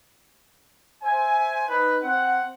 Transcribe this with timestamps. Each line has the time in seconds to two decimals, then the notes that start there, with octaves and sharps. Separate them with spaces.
1.03 C5 E5 G#5
1.68 D#4 B4
2.03 C4 F#5